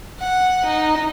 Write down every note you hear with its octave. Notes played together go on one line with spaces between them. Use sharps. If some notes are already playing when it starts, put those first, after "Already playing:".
F#5
D#4